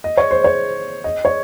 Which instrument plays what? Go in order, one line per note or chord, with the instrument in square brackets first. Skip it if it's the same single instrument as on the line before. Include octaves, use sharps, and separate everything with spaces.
[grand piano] D#5
C#5
C5
C#5
D#5
C#5